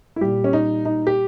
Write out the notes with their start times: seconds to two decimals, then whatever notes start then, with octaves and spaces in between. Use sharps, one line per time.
0.16 E4
0.21 A#2 G3 G4
0.44 C#4
0.53 D#4
0.85 D#4
1.07 G4